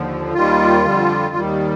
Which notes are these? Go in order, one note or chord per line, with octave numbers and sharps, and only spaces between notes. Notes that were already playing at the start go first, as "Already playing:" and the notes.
Already playing: D#2 D3 F3
D#2 D#3 G3 F4
F2 D3 G3
D#2 D#3 G3